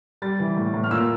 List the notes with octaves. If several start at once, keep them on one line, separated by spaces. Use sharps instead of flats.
G3 A6
E3
A2
A2
F6
A#2 E6